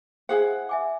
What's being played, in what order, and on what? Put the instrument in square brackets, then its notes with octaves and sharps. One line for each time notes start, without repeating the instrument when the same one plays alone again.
[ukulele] E4 G#4 F#5 [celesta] C5 F5 G#5
[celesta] E5 G#5 D6